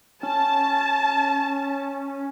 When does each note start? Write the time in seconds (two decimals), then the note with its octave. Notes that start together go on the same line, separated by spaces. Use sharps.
0.23 C#4 A5